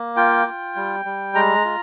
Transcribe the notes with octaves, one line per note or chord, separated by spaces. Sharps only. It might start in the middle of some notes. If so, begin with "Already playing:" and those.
Already playing: A#3
F4 G5
F4
G3
G3
G#3 A#5
F4